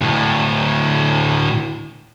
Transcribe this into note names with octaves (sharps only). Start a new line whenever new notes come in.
D2 A2